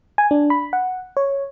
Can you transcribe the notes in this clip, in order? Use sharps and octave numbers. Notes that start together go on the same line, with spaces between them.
G#5
D4
B5
F#5
C#5